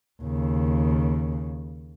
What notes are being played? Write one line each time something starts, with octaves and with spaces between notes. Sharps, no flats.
D#2 C#3